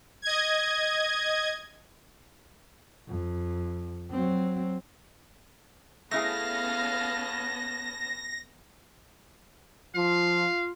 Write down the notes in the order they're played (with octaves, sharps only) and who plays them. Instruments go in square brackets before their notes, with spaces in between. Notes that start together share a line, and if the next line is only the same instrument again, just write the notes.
[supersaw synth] D#5 G#6
[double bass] F2
F#3 C4
[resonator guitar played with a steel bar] A3 E4 G#4 [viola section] B3 C#4 A5 [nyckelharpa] F5 [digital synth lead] A#6
[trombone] F3 [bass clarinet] F4 [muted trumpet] F5